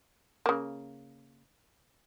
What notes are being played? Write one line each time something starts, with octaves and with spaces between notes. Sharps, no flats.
C#3 A#3